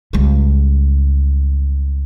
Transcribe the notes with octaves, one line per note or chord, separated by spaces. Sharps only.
C#2 G3